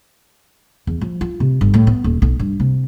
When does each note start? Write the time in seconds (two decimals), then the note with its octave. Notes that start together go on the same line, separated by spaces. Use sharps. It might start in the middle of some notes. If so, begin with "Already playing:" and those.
0.87 E2
1.01 F3
1.21 F4
1.40 C3
1.61 G1
1.74 A2
1.87 B3
2.04 D#1
2.22 B1
2.39 G2
2.60 C3